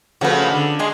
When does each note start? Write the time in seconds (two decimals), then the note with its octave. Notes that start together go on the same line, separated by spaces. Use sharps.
0.21 C#3 F3 A3 F#4 B4
0.51 D3
0.79 G#3 D#5 G#5 C6